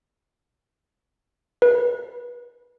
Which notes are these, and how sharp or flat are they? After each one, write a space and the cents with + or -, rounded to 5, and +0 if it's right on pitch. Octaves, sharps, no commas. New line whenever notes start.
B4 -30